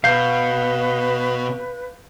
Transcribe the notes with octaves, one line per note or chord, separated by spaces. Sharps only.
B2 B4 F5 G6 C7